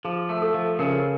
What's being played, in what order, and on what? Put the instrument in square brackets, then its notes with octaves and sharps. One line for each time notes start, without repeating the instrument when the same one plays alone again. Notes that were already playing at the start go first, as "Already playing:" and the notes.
[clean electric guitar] F3 [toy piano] G#4
[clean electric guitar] A3
[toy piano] A4
[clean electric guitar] F3
[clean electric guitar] C#3 [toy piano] A#4